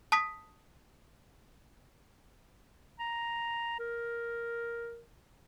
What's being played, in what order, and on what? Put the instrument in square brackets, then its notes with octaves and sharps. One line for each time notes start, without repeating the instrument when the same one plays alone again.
[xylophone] A5 D#6 B6
[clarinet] A#5
A#4